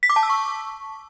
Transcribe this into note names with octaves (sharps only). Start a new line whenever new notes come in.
B6
D6
A5
E6
C#6